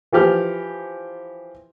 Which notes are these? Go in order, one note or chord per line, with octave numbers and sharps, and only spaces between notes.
E3 F3 G4 F6